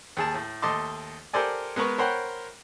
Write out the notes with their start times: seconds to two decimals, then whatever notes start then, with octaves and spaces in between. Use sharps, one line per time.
0.17 D#2 G#4 A5
0.34 A2
0.62 D#2 A3 D#5 A5 C6 D6
1.34 G4 A4 A#4 C5 D5 G#5
1.76 G#3 B3 A#4 B4 C#6
1.98 A#4 C5 C#5 F#5 G5 B5